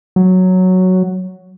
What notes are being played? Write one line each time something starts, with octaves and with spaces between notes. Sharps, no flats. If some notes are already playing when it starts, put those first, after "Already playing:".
F#3